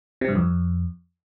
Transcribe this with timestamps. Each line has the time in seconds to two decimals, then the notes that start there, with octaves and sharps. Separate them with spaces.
0.21 C3
0.28 G2
0.36 F2